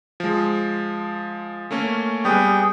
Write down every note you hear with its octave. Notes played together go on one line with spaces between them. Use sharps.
F3 G#3
A3 A#3 C#4
G3 B3 G#4 G5